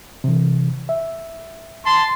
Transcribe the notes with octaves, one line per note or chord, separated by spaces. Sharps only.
C3 E3
E5
A5 C6